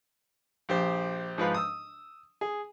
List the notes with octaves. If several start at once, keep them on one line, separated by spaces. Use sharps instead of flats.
A#1 G4 C5
G#2 F3 B4 F5
D#6 E6
G#4